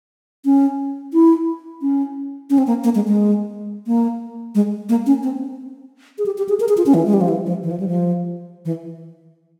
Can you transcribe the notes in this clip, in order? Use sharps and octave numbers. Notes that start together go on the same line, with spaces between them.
C#4
E4
C#4
C#4
C4
A#3
A#3
G#3
G#3
A#3
G#3
A#3
C#4
C4
G#4
G4
G4
G#4
A#4
G#4
F4
C#4
E3
G#3
G3
F3
E3
F3
E3
F3
G3
F3
E3